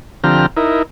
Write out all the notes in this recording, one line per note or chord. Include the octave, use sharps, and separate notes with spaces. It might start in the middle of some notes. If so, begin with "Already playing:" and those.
D3 F3 C4 G4 A#5 F6
D#4 E4 A#4